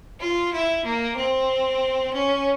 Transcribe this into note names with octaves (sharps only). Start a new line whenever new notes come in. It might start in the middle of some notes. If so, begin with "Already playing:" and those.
F4
E4
A#3
C4
C#4